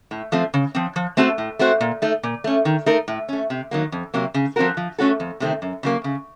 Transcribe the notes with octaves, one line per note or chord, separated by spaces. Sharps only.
A2
F3 A3 C4
C#3
F3 C4
F3
A3 C4 F#4 A4
A2
A3 C4 F#4 C5
A#2
A3 D#4
A#2
A3 C#4
D#3
A3 D#4 A#4
A2
A3 C#4
C3
D#3 F#3 A#3
F2
C3 F#3 A#3
C#3
F3 C4 F#4 A#4
F3
A3 C#4 F#4 A4
F2
C3 D#3 A3 C4
F#2
C#3 F#3 A#3
C#3